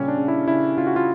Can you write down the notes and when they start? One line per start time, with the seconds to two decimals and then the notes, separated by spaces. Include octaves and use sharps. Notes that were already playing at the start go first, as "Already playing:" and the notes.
Already playing: A#2 C#3 G3 C#4
0.08 D4
0.18 C#3
0.28 E4
0.48 C#3 E4
0.78 C#3 F4
0.87 F#4
0.96 F4